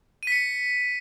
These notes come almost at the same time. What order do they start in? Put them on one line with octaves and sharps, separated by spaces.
D#7 B6 C#7